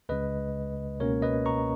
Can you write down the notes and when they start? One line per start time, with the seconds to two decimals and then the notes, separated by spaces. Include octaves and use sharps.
0.09 C#2 C#3 G#3 B4 D#5
1.00 C#2 B2 A#3 C#4 A#4 C#5
1.22 B4 D#5
1.46 A#5 C#6